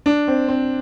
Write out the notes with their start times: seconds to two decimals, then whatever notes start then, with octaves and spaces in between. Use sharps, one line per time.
0.06 D4
0.28 C4
0.48 C4